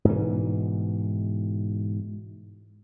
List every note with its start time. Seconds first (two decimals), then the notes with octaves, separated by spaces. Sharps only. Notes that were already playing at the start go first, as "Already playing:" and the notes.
0.05 G#2 B2 E3